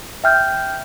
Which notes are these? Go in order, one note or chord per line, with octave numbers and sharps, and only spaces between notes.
E5 G5 F6 G6